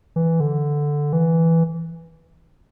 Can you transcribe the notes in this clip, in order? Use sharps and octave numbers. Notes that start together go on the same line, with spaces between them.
E3
D3
E3